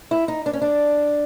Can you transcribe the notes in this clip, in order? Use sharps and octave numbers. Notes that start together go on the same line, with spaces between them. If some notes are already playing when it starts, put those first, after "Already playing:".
E4
D#4
D4
C#4
D4